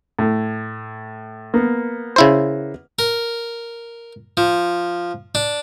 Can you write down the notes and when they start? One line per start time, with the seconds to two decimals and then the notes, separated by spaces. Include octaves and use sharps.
0.19 A2
1.54 A#3 B3
2.16 C#3 E4 C5
2.99 A#4
4.37 F3
5.35 D4